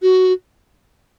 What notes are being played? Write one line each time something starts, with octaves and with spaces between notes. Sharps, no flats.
F#4